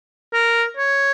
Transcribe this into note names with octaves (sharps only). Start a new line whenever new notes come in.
A#4
C#5